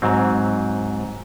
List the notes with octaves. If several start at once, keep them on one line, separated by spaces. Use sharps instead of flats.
G#2 F#3 C4